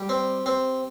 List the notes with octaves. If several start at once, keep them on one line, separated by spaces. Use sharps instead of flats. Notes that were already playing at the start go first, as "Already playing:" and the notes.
Already playing: G3 G4
C4
C4